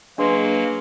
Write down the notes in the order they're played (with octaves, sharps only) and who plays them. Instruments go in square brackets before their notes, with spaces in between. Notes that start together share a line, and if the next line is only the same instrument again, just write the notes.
[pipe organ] F#3 A#3 [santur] G#3 [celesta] D4 B4